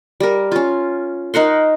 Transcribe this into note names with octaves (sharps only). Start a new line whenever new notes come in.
G3 A#4
C#4 F4
D#4 A#4 F#5 C6